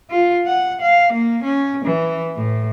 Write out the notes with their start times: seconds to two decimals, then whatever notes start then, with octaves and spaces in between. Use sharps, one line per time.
0.10 F4
0.47 F#5
0.82 F5
1.13 A#3
1.44 C#4
1.85 E3
2.37 A2